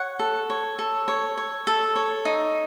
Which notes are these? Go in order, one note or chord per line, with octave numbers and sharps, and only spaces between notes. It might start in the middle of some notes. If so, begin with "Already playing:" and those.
Already playing: C#5 F#5
A4
C#5
A4
C#5
C#5
A4
C#5
D#4